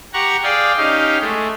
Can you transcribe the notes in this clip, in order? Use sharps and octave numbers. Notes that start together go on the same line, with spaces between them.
G4 F#5 A#5 C#6
G#4 D5 F5 G5
C#4 D#4 G4 F5
G#3 A3